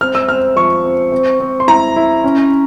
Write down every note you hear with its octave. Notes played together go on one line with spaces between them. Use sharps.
C4 F6
E6
C4 F6
F3 C#6
C4
C4
C4
C6
E4 A#5
E4
C#4